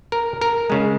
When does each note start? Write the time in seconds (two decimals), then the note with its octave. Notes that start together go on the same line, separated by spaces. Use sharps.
0.12 A#4
0.41 A#4
0.70 C#3 G#3